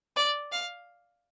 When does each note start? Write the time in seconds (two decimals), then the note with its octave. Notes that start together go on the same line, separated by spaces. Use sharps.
0.16 D5
0.52 F5